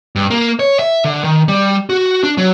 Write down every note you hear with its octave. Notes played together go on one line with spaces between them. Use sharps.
G2
A#3
C#5
E5
D3
D#3
G3
F#4
D4
F#3